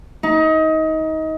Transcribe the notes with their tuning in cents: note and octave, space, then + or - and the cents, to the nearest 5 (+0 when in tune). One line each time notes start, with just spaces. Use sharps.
D#4 +25